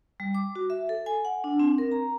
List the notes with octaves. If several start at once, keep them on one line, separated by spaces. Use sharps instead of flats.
G3
D6
F#4
E5
A4
G#5
F#5
D4
C4
A#4
A#5